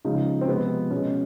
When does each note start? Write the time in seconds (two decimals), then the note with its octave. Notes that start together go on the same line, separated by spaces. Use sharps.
0.05 C#3 F3 G#3 D#4
0.41 C4
0.48 C3 F3 G#3 B3
0.91 B2 G#3 C#4